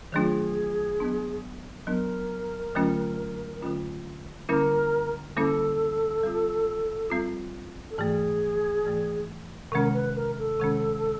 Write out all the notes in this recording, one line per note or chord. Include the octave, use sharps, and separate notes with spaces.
D#3 F#3 A3 D4 F4 G#4
F#3 B3 D4
F#3 B3 D4 A#4
D3 F#3 A3 C#4 F4
D3 F#3 A3 C#4 F4
D3 G3 A#3 C#4 E4 A#4
D3 G3 A#3 C#4 E4 A4
G3 C4 F4
G3 C4 F4
A4
G#2 E3 A3 G#4
G#2 E3 A3
C3 D#3 G#3 C#4 A#4
B4
A#4
A4
C3 D#3 G#3 C#4